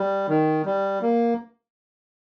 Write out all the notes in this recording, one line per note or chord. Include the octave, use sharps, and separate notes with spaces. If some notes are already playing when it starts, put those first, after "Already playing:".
Already playing: G3
D#3
G3
A#3